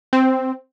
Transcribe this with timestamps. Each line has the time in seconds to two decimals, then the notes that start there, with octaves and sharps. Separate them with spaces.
0.13 C4